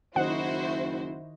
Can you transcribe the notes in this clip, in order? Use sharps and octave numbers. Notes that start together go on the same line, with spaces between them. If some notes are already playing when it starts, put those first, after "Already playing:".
F#1 D#3 D#4 E4 F#4 C5 D#5 F#5